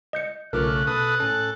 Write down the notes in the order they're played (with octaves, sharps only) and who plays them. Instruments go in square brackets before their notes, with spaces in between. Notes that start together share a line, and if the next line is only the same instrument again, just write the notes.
[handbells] D#5 G6 C#7
[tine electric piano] B1 D6 F6 [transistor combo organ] C#3 A3 [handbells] F4 A#4 [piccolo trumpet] F#6
[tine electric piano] B2 [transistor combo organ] A4 B4 D#6 [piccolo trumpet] F#6
[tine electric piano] A2 C#4 [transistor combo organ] A4